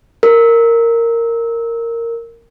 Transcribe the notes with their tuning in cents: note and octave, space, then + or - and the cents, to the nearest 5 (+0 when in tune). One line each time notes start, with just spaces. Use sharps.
A#4 -10